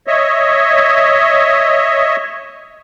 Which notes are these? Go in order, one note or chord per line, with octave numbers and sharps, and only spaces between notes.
C#5 D#5 E5